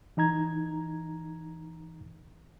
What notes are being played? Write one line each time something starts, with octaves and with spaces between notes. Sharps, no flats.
E3 D#4 A#5 G#6